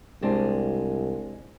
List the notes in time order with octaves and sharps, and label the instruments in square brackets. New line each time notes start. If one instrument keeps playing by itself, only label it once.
[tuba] C2 [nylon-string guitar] G#3 C4 D4